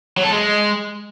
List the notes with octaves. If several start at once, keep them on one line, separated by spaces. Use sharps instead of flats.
F#3
A4
G#3